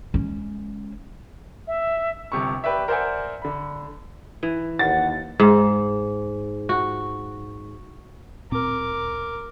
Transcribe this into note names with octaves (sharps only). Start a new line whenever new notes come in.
G#3 C#4
E5
G1 C3 C#6
G4 B4 D5 E5
A#4 C5 D5 E5 F#5 G#5
D3 B5
E3
D#2 F#5 A6
G#2
F#4
D1 A#2 C4 A#4 D6